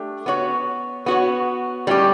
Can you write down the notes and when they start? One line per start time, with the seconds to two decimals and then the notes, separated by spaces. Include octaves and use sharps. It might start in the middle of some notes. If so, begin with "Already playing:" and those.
Already playing: A3 D4 G4
0.26 B3 F#4 C#5
1.06 B3 F#4 C#5
1.87 A2 G3 C#4 E4 G4